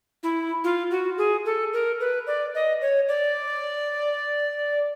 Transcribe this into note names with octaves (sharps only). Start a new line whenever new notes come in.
E4
F4
F#4
G#4
A4
A#4
B4
D5
D#5
C#5
D5